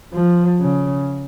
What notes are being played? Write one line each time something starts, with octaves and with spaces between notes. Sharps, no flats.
F3
C#3